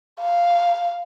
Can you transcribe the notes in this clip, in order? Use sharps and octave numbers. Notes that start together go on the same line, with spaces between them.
F5